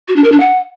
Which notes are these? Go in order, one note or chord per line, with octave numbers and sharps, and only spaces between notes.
F#4
D4
A#4
D4
F#5